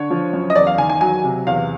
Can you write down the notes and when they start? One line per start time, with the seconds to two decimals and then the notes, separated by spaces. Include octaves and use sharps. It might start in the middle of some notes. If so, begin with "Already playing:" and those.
Already playing: D3 C#5
0.10 F3
0.33 F#2
0.50 D#5
0.55 E2 D5
0.67 F5
0.78 D#3 G#5
0.89 G#5
1.01 F#3 G#5
1.24 C3
1.47 E2 F5